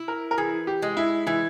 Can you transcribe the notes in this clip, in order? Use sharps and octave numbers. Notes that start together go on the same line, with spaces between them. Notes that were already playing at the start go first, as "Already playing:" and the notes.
Already playing: E4
A#4
A#4
E3 G#4
G4
G#3
E4
E3 E4